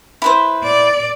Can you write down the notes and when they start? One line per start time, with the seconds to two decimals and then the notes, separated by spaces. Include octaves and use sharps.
0.22 E4 B4 C5
0.64 D5